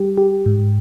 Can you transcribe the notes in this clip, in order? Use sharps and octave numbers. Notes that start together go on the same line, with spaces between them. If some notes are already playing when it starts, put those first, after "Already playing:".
Already playing: G3 G4
G4
G#2